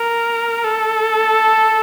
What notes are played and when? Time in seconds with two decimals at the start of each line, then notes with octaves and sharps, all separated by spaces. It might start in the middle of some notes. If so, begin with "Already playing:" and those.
Already playing: A#4
0.64 A4